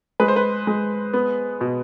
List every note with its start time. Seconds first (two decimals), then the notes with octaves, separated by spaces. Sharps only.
0.20 G#3 B4
0.28 C5
0.36 B4
0.67 G#3
1.13 B3
1.61 B2